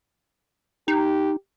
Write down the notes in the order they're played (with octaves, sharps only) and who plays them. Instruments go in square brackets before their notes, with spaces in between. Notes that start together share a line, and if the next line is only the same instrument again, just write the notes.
[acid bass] D#4 [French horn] G4